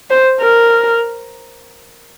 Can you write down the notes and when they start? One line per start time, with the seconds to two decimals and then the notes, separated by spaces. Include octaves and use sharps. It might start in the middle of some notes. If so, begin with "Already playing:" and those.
0.10 C5
0.41 A#4